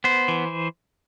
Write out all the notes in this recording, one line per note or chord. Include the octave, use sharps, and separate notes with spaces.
B3 C5
E3